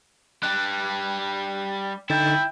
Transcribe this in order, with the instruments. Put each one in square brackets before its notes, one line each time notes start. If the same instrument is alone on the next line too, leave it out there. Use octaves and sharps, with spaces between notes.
[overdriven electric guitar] G3 D4 [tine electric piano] F#6
[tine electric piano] D3 D#4 A6 [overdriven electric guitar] E4 [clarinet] G5